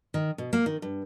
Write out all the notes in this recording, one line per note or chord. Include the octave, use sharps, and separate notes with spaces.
D#3
B2
A#3
D#3
G2